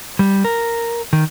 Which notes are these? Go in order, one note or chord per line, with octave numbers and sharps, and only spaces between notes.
G3
A#4
D#3